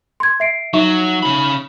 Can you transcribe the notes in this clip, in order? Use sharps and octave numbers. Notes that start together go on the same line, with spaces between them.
C6 G#6
E5 C7 D7
F#3 D#4 E5 C#6
C#3 B5